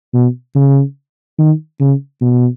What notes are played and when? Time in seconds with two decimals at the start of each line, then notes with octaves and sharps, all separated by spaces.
0.14 B2
0.56 C#3
1.39 D#3
1.81 C#3
2.22 B2